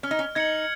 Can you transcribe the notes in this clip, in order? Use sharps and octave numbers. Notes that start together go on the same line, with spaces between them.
C#4 F6
D#4
C#4
D#4 G#6 C#7 F#7